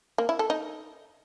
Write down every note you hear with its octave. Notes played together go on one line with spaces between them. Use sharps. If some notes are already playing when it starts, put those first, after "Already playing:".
A#3
E4
A4
D#4